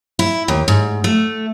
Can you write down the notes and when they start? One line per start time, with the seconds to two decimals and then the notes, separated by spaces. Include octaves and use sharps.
0.19 E4
0.48 D#2
0.68 G#2
1.04 A3